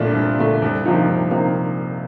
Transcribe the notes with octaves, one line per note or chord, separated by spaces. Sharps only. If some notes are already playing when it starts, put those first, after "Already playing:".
Already playing: C2 A#2 A3 D4
C2
A#2 A3 D4
C2
C3 F3 A#3 D#4
C2
C3 F3 A#3 D#4